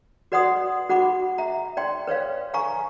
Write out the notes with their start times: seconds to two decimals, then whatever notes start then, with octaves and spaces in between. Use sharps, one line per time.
0.32 F#4 B4 D5 F#5 C6 D#6
0.89 F#4 F#5 B5 D6
1.38 E5 A#5
1.77 D5 G5 C6
2.07 B4 C#5 D5 F5
2.54 F5 G#5 A#5 C#6